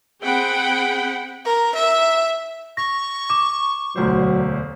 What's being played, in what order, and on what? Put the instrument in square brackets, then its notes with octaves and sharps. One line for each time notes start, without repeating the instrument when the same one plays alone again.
[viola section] C4 G#4 F#5 G5 B5
[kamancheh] A#4
E5
[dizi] C#6 [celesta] A#6
[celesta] D6 [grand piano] E7
[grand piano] E1 D2 C5 [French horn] F#3